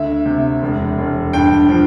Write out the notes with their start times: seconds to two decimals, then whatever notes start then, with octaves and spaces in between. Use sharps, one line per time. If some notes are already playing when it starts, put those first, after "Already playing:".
Already playing: D2 D3 E5
0.26 C3
0.62 E1
0.98 E1
1.33 G2 G5
1.69 F3